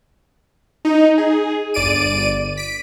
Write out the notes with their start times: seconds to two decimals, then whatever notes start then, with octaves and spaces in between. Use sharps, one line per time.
0.85 D#4
1.18 G#4
1.74 G1 D5 D7 D#7
2.57 B6 D7